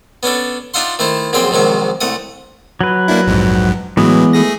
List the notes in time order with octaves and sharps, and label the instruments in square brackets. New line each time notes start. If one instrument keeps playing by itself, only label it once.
[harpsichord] B3 C#4 D4 A4
D4 D#4 F4 E5 F#5 C6
D#3 A3 E4 C5
A#1 F#2 D3 C4 G#4 G5
A#1 G#2 C3 D#3 F#3 C#6
C2 A3 F#5 D#6
[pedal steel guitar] F#3 B4
[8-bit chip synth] A#3 D4 E4
A#1 F2 G#2
[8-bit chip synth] A2 F#3 [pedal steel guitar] E3 G#3 B3
[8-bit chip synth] A3 G#4 A#6